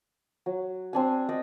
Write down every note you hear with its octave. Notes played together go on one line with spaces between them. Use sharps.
F#3
C4 D4 G#5
D5 D#5 G5